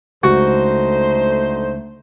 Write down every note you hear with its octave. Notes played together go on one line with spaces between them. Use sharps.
C#2 D3 A3 D#4 F#4 A4 C5